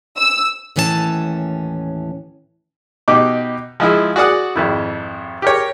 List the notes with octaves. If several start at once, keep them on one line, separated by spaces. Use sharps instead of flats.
E6
D#2 A2 E3 C#4 G#4 A5
B2 D#4 G4 D6
F3 G#3 E4
F#4 G#4 D5 F#5 D#6
G#1 F2 E4
G4 A#4 C#5